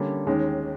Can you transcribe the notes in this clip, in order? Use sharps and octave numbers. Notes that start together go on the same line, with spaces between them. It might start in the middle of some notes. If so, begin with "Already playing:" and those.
Already playing: D3 G3 A#3 C#4
D#2 D#3 G#3 C#4